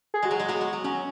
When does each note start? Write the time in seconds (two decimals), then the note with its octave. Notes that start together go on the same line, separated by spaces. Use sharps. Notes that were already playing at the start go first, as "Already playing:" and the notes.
0.14 G#4
0.23 G#3 F#4
0.31 F#3
0.37 G#3 G#4
0.48 F#3 B3 F#4
0.61 G#3
0.73 F#3
0.84 F#3 C#4